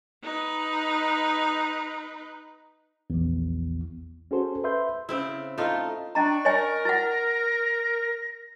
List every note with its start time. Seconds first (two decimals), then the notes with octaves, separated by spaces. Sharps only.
0.23 D#4 B4
3.10 A#1 E2
4.31 C#4 F#4 G#4 A4 C5
4.64 B4 E5 C6 G6
5.09 C#3 C4 E4
5.58 A3 D#4 F4
6.15 C#4 D4 D#5 A#5 C#6
6.45 A#4 C#5 D#5 G#5
6.85 E4 F#5 A#6